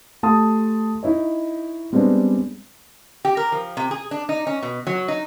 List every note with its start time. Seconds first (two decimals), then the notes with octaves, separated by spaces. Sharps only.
0.23 A3 G4 A5 C6 D#6
1.03 D#4 E4 C#5 D#5
1.93 G3 G#3 B3 C4 D4
3.25 G4
3.37 A#4
3.52 F3
3.77 C3
3.91 G#4
4.11 D4
4.29 D#4
4.47 C#4
4.62 B2
4.87 F#3
5.08 D#4